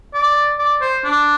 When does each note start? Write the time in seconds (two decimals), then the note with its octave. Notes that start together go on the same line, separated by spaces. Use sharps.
0.14 D5
0.59 D5
0.81 C5
1.05 D4